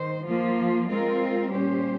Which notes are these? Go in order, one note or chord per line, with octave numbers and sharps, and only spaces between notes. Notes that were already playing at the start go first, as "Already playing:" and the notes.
Already playing: D#3 C5
F3 A#3 F4
G#3 C4 F4 A#4
A#2 G3 C#4 G4 C5